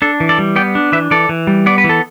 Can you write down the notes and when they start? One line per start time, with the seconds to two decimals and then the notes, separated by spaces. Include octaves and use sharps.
0.02 D4 A4
0.20 E3
0.29 A4 D5
0.38 G3
0.56 B3 D5 G5
0.75 D4
0.92 E3 B4 E5
1.11 E3 A4 D5
1.29 E3
1.47 G3
1.66 B3 D5
1.78 B4
1.84 E3
1.89 A4